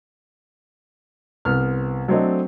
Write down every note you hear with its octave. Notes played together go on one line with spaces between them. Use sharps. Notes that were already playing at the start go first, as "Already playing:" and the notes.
C2 B3 F6
F#3 A3 C4 D4 A4 D#5